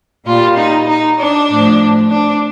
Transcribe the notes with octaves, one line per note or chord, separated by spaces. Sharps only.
A#2 G3 F4
D#4
D#4
D4
A2 F3
D4